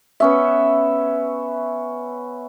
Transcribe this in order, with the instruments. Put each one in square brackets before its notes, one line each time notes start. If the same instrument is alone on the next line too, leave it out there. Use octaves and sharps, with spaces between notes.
[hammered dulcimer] B3 C#4 E5